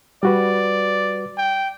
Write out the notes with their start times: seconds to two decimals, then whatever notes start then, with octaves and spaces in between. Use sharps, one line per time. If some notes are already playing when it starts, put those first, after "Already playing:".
0.23 G3 F#4 B4 D5
1.37 G5